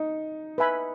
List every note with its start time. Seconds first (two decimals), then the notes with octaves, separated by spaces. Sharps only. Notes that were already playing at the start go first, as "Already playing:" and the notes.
Already playing: D#4
0.58 B4 E5 G#5 B5